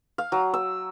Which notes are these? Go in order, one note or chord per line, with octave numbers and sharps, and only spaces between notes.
F5
F#3
E6